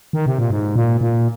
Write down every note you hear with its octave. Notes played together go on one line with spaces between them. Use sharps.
D#3
C3
A#2
G#2
A#2
A#2